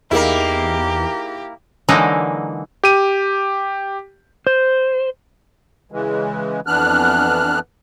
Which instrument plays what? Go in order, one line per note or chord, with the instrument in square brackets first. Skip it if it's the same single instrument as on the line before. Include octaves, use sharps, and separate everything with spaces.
[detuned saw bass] E2 [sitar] A#3 E4 [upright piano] D#4 G#4 A#4 [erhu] G4
[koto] D3 E3 F#3 G#3 A#3 D#4
[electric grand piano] G4 D#7
[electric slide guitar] C5
[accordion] C#3 E3 G#3
F2 E3 B3 D4 F6 F#6